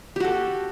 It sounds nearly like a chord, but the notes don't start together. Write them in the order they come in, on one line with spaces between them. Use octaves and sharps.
G4 F#4 A4